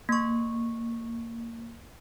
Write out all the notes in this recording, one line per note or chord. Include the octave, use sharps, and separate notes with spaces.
A#3 C#6